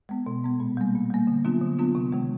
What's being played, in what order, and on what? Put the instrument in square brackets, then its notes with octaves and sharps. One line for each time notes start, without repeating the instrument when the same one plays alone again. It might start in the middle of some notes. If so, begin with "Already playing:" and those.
[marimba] G#3 B3
B2
G#3 B3
A#2
G3 A#3
A#2
G3 A#3
D3
F#3 B3 D4 F4
D3
F#3 B3 D4 F4
C3
D#3 G#3